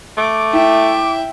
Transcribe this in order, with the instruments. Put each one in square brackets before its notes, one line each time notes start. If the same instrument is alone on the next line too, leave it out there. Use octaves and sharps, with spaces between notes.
[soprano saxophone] A3 [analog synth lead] D6
[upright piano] E4 [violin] E5 G5